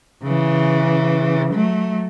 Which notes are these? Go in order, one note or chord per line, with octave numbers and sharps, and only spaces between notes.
C#3 E3
F#3 A3